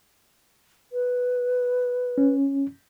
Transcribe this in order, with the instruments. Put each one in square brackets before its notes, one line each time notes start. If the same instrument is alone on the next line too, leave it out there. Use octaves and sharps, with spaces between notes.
[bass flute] B4
[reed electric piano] C#4